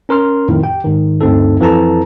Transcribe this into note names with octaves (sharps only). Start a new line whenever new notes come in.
C#4 A#4 C6 F6
F2 A2 D#3
G4 G5
G#2 D#3
D2 G2 C4 D#4 A4
F2 E3 A4 A5 A#5